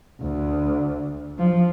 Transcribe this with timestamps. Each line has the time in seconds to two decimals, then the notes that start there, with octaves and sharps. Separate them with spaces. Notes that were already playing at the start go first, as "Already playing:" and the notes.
0.21 D2
1.38 F3